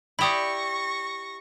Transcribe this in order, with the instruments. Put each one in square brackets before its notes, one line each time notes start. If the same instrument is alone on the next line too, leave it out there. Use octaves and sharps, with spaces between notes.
[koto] E4 G4 D5 [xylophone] B5 D#6 [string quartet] C#6 A#6